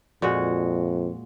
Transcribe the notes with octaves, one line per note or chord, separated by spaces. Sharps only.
F2 A#2 G#3 F#4